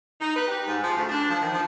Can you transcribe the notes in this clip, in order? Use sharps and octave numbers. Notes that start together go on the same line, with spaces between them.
D#4
B4
G4
G#2
F3
D2
D4
F3
D#3
F3